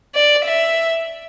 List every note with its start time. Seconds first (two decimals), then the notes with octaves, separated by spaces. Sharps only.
0.15 D5
0.44 E5